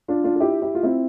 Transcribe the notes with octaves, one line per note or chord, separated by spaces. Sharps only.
D4 F4
D4 F4
F4
E4 G4
E4 G4
F4
C4 E4